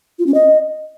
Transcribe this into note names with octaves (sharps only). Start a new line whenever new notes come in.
F4
C#4
D#5